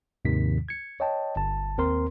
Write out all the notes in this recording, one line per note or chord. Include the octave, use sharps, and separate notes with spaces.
D#2 G#2 C3 D#3 B6
G#6 C#7
C#5 D#5 G5 A5
G1 A5
D#2 C4 A#4 C6